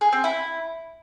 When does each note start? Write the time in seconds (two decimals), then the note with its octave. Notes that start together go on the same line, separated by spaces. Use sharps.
0.01 G#4
0.12 C4
0.24 E4